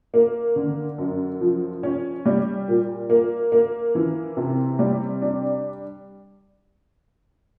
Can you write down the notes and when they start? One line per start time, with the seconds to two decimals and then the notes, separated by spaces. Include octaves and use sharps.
0.14 A#3
0.56 D3
0.98 F#2
1.41 F3
1.83 C#4
2.26 G3
2.68 A#2
3.10 A#3
3.52 A#3
3.95 E3
4.37 C3
4.79 G3
5.22 D4